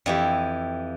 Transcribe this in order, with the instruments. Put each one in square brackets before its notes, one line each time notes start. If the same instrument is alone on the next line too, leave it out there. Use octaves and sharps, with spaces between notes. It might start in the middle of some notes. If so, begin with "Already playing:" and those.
[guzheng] F2 E3 G4